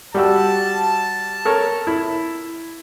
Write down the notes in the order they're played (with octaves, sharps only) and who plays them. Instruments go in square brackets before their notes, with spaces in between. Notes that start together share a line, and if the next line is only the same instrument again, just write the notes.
[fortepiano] G3 F#4 E6 [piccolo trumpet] A5
[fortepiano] A4 A#4 C#5
E4